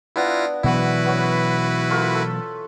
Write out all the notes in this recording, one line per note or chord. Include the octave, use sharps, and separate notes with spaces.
B3 D4 E4 F4 A#6
B2 E3 F#3 B3 E4 F#4 B4
B3 C#4
A3 A#3 F4
A4